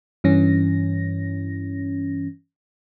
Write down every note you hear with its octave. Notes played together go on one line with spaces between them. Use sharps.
G2 E3 C#4 A#6